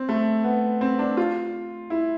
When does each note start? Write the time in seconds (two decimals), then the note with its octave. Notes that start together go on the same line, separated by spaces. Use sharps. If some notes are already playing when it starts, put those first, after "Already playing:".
Already playing: C4
0.09 A3
0.44 B3
0.81 C4
0.99 D4
1.17 F4
1.90 E4